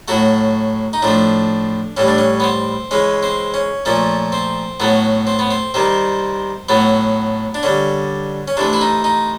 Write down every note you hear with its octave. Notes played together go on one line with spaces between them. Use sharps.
A2 F#3 A3 F#4
D#4
A2 F3 A3 D4
A2 E3 G3 C#4
D4
C#4
B3
C4
C#3 E3 G#3 C#4
C4
C#4
A#2 F3 A3 C#4
C4
A2 F#3 A3 B3
C4
B3
C4
C3 D#3 G3 C4
A2 F#3 A3 B3
D4
D3 G3 C#4
C#4
C3 E3 A3 D4
E4
D#4
D#4